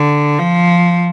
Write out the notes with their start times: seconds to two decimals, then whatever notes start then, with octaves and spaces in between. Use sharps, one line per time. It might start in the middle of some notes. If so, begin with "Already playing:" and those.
Already playing: D3
0.39 F3